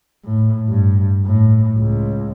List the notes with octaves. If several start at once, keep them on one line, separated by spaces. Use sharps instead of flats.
A2
G2
A2
C#2